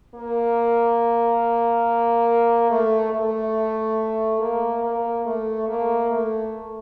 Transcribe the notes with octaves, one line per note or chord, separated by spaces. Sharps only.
A#3
A3
A3
A#3
A#3
A3
A#3
A3